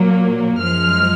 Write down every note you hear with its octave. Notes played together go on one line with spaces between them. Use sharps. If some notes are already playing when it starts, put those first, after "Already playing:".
Already playing: A#2 F#3 A#3
F#2 F3 G#3 F6